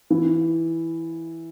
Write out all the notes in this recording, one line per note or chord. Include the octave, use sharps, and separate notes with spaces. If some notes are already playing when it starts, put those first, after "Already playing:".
E3